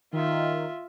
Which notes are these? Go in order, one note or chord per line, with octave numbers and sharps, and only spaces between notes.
D#3 F4 E5